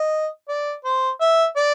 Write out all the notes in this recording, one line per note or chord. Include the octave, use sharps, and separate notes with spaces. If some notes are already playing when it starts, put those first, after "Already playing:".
Already playing: D#5
D5
C5
E5
D5